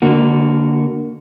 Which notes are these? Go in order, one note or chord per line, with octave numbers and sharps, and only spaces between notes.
D3 A#3 F#4